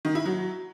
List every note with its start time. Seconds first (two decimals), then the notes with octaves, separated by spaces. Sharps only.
0.05 D#3
0.15 E4
0.26 F#3